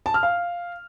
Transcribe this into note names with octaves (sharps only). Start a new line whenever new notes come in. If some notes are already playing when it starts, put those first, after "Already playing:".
A5
F6
F5